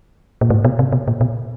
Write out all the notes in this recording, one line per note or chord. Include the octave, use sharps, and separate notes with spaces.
A#2
A2
B2
C3
B2
A#2
B2